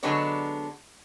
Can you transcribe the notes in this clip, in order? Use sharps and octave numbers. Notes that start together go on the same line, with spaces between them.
D3 F#3 G#3 B3 D4 C#5